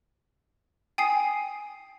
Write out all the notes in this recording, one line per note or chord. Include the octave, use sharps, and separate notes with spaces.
G5 G#5 D#6 C7